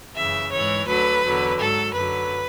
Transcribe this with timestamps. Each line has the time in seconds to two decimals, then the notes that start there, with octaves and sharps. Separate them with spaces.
0.15 F#2 C#3 E3 E5
0.51 G#2 E3 C#5
0.87 D2 D3 F#3 B4
1.23 E2 D3 F#3
1.59 G#2 F#3 A4
1.94 F#2 D3 F#3 B4